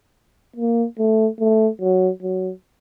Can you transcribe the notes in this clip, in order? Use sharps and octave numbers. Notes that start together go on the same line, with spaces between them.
A#3
A3
A3
F#3
F#3